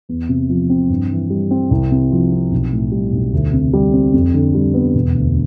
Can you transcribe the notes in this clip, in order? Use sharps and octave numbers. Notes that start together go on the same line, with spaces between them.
E2
C3
F3
C4
G2
E3
G3
C4
C2
C3
F3
C4
B1
A2
G3
B1
D2
C3
G3
C4
F2
D3
G3
B3
E1
D2